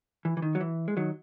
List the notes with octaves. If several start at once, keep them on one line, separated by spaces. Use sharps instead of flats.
E3
E3
D#3
F#3
E3
G#3
D#3 F#3